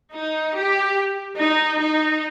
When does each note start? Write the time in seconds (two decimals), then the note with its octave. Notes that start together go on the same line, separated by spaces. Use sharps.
0.13 D#4
0.55 G4
1.38 D#4
1.79 D#4